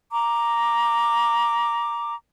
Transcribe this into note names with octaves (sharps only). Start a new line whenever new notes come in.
A#5 D6